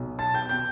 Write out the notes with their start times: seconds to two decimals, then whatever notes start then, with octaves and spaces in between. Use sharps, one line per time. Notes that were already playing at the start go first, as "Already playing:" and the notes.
Already playing: B1 B2
0.19 A5 A6
0.34 G5 G6
0.49 B2 G5 G6